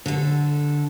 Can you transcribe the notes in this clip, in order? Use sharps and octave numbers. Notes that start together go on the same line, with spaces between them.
D3 A4